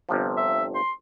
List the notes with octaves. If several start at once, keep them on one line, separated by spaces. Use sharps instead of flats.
G1 C3 F3
E5
C6